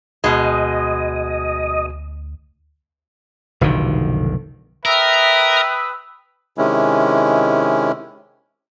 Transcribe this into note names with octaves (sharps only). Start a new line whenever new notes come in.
D2 B2 G#3 D#5
F1 B1 D3 D#3
A#4 B4 E5 G5 D#6 E6
C3 D#3 G#3 C#4 E4